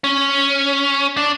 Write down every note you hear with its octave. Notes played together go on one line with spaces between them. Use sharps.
C#4
D4